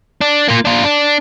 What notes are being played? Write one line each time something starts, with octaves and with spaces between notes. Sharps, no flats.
D4
A#3 F4
D4 F4
D4